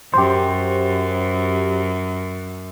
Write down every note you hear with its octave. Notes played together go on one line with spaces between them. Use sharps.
F#2 G4 C5